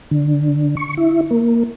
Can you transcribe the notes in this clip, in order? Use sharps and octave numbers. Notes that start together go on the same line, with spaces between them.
D3
C#6
E4
A#3